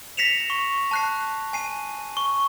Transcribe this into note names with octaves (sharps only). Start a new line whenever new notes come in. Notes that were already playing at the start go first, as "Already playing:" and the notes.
A#6 B6 C#7 E7 F7
C#6
A5 F#6 C7
G#5 C7 D#7
C#6